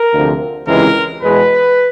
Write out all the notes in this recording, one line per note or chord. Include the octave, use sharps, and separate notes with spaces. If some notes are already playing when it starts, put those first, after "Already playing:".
Already playing: A#4
D2 C3 F3
C#2 C3 E3 G#3 A#4
E2 B2 G#3 B4